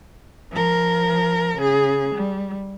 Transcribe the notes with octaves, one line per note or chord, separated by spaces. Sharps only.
F3 A#4
C#3 G#4
G3